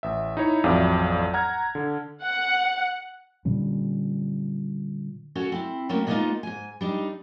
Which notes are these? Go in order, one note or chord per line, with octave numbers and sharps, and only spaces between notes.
A1 E5
D#4 E4 C#5
A1 F2 F#3 D5 E5 F5
F#5 A#5 F6 G#6
D3
F#5
A#2 D3 G3 C#4
C#4 F#4 A4 C#5
C4 E4
F#3 A3 A#3 C4 C#4
G#3 A#3 B3 C#4 D#4 F4
G#2 G#5
G3 D4 D#4